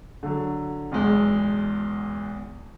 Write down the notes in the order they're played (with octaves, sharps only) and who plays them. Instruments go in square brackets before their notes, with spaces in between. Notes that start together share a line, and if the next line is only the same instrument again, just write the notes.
[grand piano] D3 F#3
B1 E2 B2 G#3